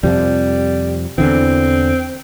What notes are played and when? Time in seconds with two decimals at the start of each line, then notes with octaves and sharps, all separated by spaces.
0.03 F2 C3 F3 G3
1.18 E2 D3 E3 C4